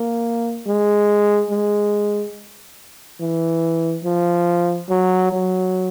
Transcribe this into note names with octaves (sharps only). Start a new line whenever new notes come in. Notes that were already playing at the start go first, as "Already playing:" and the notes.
Already playing: A#3
G#3
G#3
E3
F3
F#3
F#3